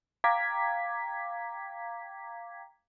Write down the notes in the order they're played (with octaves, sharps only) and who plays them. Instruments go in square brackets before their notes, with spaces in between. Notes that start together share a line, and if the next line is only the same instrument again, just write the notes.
[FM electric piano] F5 G5 A#5 D6 G#6 B6